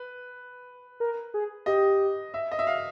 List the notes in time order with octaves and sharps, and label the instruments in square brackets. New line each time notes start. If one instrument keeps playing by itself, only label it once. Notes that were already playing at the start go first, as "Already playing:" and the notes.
Already playing: [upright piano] B4
[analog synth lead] A#4
G#4
[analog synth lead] G4 [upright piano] D#5
[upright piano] E5
D#5
E5
F5